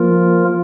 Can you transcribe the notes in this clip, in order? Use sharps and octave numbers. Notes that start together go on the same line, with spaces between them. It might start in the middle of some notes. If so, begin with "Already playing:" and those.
Already playing: F3 A#3 F4 A#4